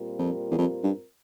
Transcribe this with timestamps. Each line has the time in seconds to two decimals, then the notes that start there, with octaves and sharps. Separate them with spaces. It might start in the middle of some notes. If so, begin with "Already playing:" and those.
Already playing: A#2 G3 C4 F4 A#4
0.19 F2
0.51 E2
0.58 F2
0.83 G2